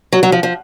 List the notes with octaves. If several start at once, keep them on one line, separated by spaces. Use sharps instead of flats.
F#3
F#3
F3
F3